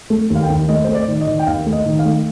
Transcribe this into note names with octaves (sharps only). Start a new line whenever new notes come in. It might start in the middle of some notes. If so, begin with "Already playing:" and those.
A3
D#2
F5
G5
D#2
A3 D#5
A3 C5
D5
D#3
D#5
D#3
G5
D#2 F5
A3
D#5
D#3
F5
A3